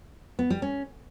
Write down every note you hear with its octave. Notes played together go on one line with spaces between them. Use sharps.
B3
G3
C#4